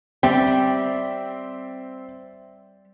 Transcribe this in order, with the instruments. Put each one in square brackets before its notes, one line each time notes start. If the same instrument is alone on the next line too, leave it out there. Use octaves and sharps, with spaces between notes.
[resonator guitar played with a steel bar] G3 [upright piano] C4 [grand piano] E5 G5